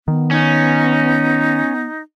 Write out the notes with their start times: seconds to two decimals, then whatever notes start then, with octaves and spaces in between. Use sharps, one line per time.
0.08 D#3 B3
0.31 C#4 D#4